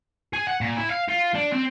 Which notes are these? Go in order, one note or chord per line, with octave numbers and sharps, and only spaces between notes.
G#4
F#5
A#2
E4
F5
F4
D4
C4